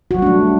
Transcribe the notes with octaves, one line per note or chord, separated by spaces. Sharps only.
F#3 G3 A3 D4 F#4